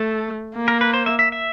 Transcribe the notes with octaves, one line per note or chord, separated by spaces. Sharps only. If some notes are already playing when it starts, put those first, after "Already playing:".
Already playing: A3 A4
A#3
A#4
B4
C5
E5
E5
E5